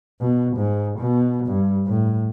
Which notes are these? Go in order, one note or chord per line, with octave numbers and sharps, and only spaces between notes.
B2
G#2
B2
G2
A2